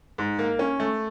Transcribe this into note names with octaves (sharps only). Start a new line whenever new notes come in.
G#2
A#3
C#4
A3